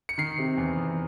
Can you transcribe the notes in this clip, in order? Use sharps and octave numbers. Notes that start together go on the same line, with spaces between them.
C#7
D#3 C7
C3
E2
E2